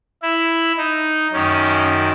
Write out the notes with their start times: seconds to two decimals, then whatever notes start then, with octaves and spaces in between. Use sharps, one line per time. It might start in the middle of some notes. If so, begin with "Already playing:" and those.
0.22 E4
0.77 D#4
1.33 F#2 D#3 C#4